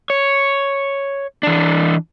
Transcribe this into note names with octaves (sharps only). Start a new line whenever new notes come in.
C#5
E3 D4